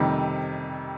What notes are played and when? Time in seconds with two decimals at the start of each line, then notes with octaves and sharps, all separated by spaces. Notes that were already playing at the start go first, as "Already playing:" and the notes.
Already playing: F2 C3 D#3 G3